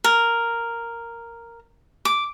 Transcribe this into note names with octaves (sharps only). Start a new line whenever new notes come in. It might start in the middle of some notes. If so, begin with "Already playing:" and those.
A#4
D6